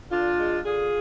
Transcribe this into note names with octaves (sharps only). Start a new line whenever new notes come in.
D3 D4 F4
G#3
D3 F4 G#4